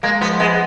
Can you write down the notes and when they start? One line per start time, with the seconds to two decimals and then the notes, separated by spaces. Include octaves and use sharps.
0.03 G#3 A#3
0.21 F3 B3
0.40 G#3 B3